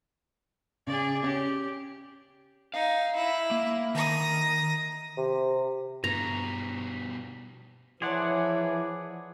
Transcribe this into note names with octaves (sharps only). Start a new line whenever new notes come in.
C#3 G#4 D5
C#4 G4
D#4 F5
E4
A#3
D#3 A#5 D#6
C3
G2 B2 G3 A#5
E3 F3 G#4 C#5 D5 F#5 A5 C6